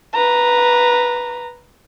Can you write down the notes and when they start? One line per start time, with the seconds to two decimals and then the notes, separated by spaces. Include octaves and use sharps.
0.14 B4 A#5